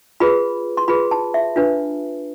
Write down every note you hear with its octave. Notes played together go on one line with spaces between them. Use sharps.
F4 G#4 B4 B5
C6
F4 G#4 B4 B5
A5
E5
D4 F4 B4